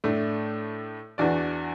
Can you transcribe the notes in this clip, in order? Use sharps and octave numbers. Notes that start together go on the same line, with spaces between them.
A2 A3 D4
E2 E3 D4 F#4 D5